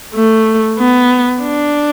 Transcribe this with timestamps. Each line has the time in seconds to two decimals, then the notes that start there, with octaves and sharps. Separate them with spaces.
0.14 A3
0.78 B3
1.42 D4